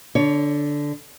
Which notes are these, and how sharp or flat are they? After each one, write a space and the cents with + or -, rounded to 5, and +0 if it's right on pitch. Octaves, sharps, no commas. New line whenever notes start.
D3 -5 C#5 +20